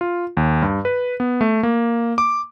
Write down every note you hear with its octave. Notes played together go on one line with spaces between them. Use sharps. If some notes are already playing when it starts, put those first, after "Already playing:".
F4
D#2
G2
B4
B3
A3
A#3
D6